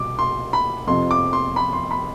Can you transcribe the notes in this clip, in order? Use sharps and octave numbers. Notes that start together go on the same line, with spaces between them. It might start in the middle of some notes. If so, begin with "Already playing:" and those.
Already playing: C2 B2 D6
C6
B5
F2 C3 F3 C6
D6
C6
B5
C6
B5